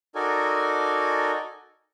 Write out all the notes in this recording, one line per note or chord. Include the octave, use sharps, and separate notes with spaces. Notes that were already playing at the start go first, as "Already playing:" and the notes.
D#4 F#4 A4 A#4 D5 G#5